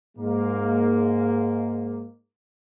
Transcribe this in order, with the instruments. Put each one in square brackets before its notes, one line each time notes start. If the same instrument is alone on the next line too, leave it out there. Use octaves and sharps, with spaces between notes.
[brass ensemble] G#2 G#3 A#3